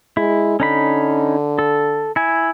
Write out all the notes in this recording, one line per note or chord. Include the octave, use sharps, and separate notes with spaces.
G#3 E4
D3 C#4 D#4 B5
A4
E4 G#5